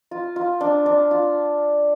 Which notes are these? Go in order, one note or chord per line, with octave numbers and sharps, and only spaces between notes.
F4
F4
D4
D4
F4